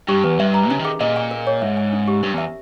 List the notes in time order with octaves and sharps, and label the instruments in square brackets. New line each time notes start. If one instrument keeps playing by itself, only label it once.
[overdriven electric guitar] G2 [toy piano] G4
[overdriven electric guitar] E2 [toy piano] B4
[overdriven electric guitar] G2 [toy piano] E5
[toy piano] A#5
[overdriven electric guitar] C#3 [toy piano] C#4
[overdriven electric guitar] D#3 [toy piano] G#4
[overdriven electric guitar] A#2 [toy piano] D#5
[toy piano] G#5
A#4
C#5
[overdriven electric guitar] G#2 [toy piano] E5
[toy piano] G#5
C#4
G4
[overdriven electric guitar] G2 [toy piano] A#4
[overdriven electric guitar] E2 [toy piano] E5